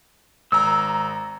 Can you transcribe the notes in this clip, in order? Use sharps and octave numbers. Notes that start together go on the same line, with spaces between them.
G#1 A#5 E6